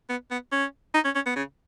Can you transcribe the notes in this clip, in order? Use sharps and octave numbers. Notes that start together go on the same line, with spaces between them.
B3
B3
C#4
D#4
C#4
C#4
B3
C#3